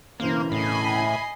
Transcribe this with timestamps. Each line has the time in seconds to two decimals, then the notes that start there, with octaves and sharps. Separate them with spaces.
0.20 E1 C#3 E3 A#3 A#4 C5
0.52 A2 D#5 G#5 B5 C7